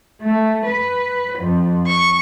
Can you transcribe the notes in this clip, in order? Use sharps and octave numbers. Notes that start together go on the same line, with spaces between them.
A3
B4
F2
C#6